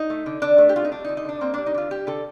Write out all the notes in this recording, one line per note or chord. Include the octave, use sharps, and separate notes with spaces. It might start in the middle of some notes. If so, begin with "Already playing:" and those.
Already playing: D#4
A3
D3
D3 D4
A3
G4
A3 F4
D#4
G3 D4
D#4
D3
D#4
D3 D4
A#3 C4
G3 D4
D#4
D3 F4
G3 G4
D3 A4